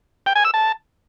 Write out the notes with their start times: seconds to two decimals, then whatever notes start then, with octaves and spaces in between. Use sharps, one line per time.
0.26 G5
0.35 G#5
0.45 E6
0.54 A5